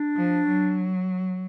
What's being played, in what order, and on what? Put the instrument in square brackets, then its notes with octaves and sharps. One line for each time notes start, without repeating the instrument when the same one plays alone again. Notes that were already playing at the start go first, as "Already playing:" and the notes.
Already playing: [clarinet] D4
[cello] F3
F#3